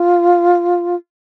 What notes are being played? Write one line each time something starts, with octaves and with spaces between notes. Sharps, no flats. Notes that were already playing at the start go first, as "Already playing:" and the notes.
Already playing: F4